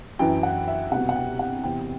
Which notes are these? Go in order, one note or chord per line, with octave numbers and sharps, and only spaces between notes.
F#2 E3 G5
F#5
E5
C2 B2 F#5
F#5
G5
F#5
E2 C3 E3 G5